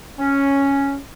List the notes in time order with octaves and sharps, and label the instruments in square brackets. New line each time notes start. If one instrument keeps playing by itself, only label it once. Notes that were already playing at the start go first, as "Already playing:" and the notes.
[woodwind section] C#4